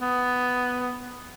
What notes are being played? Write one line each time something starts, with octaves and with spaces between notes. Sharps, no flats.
B3